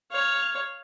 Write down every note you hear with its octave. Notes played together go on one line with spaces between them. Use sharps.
C#5 F5